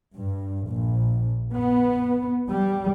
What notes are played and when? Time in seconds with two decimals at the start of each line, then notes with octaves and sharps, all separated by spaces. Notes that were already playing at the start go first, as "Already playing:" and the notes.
0.14 G2
0.67 A#1
1.52 B3
2.49 G3